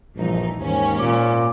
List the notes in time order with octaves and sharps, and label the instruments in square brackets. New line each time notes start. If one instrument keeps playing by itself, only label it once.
[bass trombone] A#1 [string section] G2 E3 D#4
[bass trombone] D#2 [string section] G#2 C#4
[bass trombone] A#2 [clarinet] D6